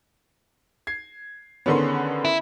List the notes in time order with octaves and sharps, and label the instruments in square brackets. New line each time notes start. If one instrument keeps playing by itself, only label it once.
[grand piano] G#6 C7
[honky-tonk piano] D3 D#3 B3 [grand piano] C#4 G#4 C6
[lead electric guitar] E4